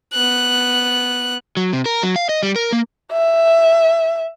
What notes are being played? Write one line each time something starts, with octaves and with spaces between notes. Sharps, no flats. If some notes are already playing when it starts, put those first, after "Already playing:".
B3 F#6
F#3
C3
A#4
F#3
F5
D#5
G3
A#4
A#3
E5